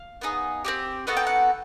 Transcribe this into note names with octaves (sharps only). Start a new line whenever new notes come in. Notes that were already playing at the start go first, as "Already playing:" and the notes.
Already playing: F5
B3 D#4 G#4
C4 D#4 G4
B3 D#4 F#4 A4 F#5
G5
F#5